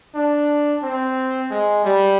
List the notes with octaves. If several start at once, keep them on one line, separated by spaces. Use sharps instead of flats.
D4
C4
G#3
G3